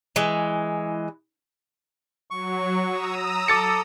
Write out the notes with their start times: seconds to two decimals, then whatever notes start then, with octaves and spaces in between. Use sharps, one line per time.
0.16 E3 G#3
2.31 F#3 C#6
2.86 A#5 D#6 E6
3.48 A4 D6 A6 C#7